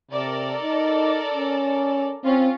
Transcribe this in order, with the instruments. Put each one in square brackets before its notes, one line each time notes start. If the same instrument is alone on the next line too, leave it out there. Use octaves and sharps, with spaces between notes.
[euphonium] C3 [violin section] A4 A#4 D5
[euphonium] D#4
C#4
[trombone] C4 [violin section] C#4 F4